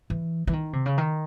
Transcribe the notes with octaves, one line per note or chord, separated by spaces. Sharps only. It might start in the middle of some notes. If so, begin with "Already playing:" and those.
E3
E3
D#3
C3
C#3
D#3